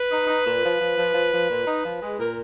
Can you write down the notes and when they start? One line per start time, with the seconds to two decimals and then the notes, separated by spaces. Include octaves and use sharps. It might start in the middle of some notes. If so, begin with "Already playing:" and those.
Already playing: B4
0.11 D#4
0.27 D#4
0.45 A#2
0.63 F3
0.80 F3
0.98 F3
1.14 F3
1.33 F3
1.50 A#2
1.66 D#4
1.84 F3
2.01 G#3
2.18 A#2 A#4